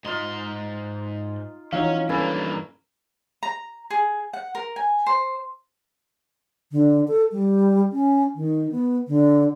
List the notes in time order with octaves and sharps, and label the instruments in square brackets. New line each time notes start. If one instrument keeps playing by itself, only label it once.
[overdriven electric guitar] G#2 C6 [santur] D#4 F4
[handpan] E3 D#4 F4 [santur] F#3 A#5 [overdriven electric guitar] C#4 [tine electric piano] F5
[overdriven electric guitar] G2 A#3 [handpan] C#4 B4 [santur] A4 G#5 B5
[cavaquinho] A#5
G#4
F#5
A#4
G#5
C5
[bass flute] D3
A4
G3
C#4
D#3
B3
D3